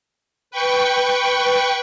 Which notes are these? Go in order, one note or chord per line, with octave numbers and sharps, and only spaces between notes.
B4 G5 C#6